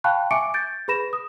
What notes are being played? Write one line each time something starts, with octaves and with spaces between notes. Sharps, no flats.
F5 G5 A5 B5 C#6 F#6
E5 G#5 C#6 D6 C#7 D7
G6 A6 D7
G#4 B4 B5 A#6 E7
D#6